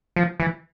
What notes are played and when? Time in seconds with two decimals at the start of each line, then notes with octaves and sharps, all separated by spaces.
0.16 F3
0.40 E3